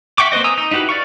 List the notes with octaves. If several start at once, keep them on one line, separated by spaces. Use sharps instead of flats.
E5 F#5 G5 C#6 D6
A#3 C4 B4 C5 D#5
G#5 A#5 D#6 E6
D#4
D#4 E4 F#4 G4 B4
D5 F5 C#6